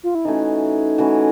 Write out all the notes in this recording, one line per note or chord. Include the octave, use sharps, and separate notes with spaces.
F4
E4
E3 A3 C#4 D#4 F#4
E3 A3 C#4 F#4